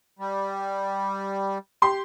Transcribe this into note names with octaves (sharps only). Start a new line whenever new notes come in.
G3
G4 C6